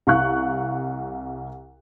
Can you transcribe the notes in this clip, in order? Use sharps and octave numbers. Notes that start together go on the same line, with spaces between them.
C2 F5 C#6 F#6